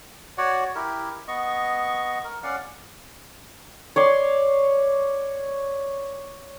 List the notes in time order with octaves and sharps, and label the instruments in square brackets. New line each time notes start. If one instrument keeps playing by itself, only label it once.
[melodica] F#4 C#5 D5 F#5
E4 G4 A#4
B3 D#5 C#6
A#4
C#4 D5 F5 F#5
[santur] C#5 D5 C6